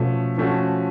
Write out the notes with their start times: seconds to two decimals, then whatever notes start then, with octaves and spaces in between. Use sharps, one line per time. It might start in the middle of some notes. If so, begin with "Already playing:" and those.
Already playing: B2 F3 A3 C#4 F#4
0.38 F3 A3 C#4 F#4